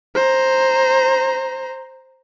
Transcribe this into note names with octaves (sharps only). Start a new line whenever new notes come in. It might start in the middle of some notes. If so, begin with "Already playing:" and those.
C5 A#5